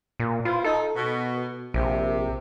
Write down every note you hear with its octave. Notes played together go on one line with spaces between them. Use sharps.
A#2
E4 F4 B4 C5
D#4 A4
B2
A#1 C3